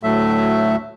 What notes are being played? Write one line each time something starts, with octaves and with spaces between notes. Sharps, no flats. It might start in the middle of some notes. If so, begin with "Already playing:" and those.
D2 A2 F#3 A3 E5